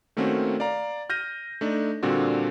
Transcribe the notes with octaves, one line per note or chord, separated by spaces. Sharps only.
D#3 A3 A#3 C4 C#4 F#4
D5 F5 A#5
F6 G6 A#6 D#7
A3 D4 D#4
A#2 D3 G3 C4 D4 F#4